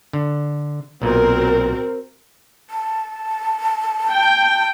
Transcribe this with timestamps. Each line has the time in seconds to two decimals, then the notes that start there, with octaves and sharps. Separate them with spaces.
0.13 D3
1.02 B1 A#2 C4 F#4 A#4
2.70 A5
4.12 G5